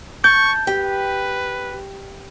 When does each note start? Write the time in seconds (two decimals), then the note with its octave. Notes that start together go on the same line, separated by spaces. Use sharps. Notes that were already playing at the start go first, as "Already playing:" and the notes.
0.24 A5 C#6 G6
0.67 G4 B4